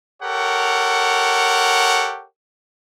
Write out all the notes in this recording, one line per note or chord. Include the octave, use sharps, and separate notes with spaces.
G4 A4 A#4 C#5 F#5